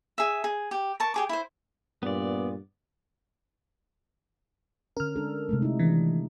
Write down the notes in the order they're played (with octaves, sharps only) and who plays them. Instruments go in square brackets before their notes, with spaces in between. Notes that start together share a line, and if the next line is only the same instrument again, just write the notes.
[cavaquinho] G#4 E5
G#4
G4
A#4 A5 C#6
G4 G#4 D6
E4 C5
[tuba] G2 [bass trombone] A#2 [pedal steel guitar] B3 D5
[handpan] D3 C#4 [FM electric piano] A#4 F6
[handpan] G#3 D4 A4
C3 G#3 A3
D#4 E4
[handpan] D#3 D4 [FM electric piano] E3